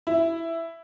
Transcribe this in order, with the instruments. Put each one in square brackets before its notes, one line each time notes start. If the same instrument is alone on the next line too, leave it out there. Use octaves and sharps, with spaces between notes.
[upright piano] E4